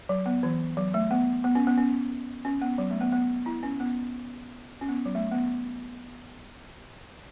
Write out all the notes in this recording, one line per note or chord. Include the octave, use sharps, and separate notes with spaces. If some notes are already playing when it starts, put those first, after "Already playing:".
F#3
B3
E3
F#3
A3
B3
B3
C#4
B3
C#4
C#4
B3
F#3
A3
B3
B3
E4
C#4
B3
C#4
B3
F#3
A3
B3